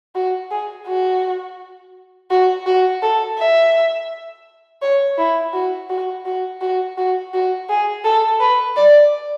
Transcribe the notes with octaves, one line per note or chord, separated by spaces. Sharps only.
F#4
G#4
F#4
F#4
F#4
A4
E5
C#5
E4
F#4
F#4
F#4
F#4
F#4
F#4
G#4
A4
B4
D5